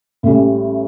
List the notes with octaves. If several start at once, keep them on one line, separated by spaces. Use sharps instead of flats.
A1 A2 G3 C#4 G4